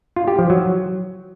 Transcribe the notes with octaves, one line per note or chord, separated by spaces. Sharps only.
F4
G4
F3
F#3